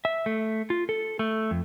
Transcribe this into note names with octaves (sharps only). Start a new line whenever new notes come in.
E5
A3
F4
A4
A3
F2